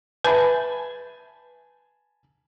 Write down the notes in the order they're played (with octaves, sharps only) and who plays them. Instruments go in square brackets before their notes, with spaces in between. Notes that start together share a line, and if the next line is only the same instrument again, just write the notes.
[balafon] B4 E5 [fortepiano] G#5 A5 B5